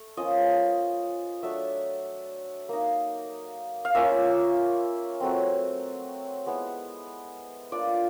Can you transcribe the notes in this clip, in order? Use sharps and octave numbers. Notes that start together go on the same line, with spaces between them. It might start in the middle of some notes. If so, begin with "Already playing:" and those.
Already playing: A3
F3 A#3 C#4 F4 D#5
F#3 A3 D4 E5
A#3 D#4
F5
A#3 C#4 F4 E5
F#3 A3 C4
G#3 B3 E4
A#3 D4 F4 D5